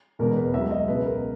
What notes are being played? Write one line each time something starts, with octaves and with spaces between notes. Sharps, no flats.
E1 E2 B2 G#3 A#4
B4
C#2 C#3 F#3 E5
D#5
C#2 B2 G#3 B4
A#4